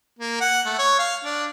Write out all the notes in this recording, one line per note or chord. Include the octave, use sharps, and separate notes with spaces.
A#3
F#5
A3
C#5
F5
D4